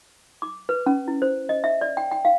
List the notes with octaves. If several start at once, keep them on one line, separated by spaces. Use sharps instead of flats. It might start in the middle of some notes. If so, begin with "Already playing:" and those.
D6
B4
C#4
E4
C5
D#5
E5
D5
G5
G5
F5